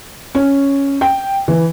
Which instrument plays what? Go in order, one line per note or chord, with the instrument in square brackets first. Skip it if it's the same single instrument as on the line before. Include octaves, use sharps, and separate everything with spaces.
[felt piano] C#4
G5
E3